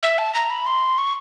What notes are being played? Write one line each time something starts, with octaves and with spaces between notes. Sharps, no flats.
E5
A5
A#5
B5
C6
C#6